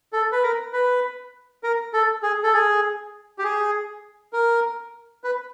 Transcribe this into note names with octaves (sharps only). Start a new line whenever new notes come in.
A4
B4
A#4
B4
A#4
A4
G#4
A4
G#4
G4
G#4
A#4
B4